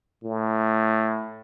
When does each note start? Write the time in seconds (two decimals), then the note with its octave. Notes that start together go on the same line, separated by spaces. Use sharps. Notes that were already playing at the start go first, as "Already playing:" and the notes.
0.24 A2